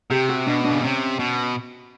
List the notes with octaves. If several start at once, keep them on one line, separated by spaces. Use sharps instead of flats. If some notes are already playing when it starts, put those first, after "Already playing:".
C3 G4
F#4
B2 D4
D4
C#3
C3 C#4
B2